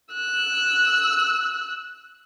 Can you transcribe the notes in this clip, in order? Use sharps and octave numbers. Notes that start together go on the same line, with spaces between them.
E6 F#6